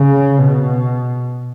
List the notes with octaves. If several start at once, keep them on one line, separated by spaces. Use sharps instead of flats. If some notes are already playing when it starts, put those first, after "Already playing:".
Already playing: C#3
B2